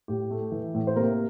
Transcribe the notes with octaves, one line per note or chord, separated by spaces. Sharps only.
A2 G4
A3
E3
A2
C5
C3 A#3 A#4